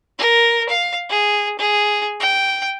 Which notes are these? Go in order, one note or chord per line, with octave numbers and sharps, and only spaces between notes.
A#4
F5
G#4
G#4
G5